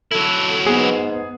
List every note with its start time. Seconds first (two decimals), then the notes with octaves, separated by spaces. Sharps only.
0.12 F#3 E4 A4
0.66 G#2 B3 G#4